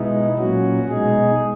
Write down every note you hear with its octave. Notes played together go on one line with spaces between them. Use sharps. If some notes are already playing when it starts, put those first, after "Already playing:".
Already playing: B2 G#3 B3 D#4 E4
A#2 F#3 C#4 F#4
B2 G#3 D#4 G#4